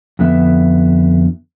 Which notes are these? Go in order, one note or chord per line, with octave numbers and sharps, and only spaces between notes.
F2 D3 B3 E5